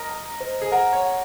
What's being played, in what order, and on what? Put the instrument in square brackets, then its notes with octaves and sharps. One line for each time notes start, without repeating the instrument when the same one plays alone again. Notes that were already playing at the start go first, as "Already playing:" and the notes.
Already playing: [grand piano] A#4 D#5
[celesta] A#5
C5
[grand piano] G#4
[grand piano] A#4 [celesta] F#5
[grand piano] C#5
[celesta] F#5